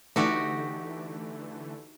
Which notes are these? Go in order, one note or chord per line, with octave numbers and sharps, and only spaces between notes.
D3 E3 A3 D#4 F#4 G4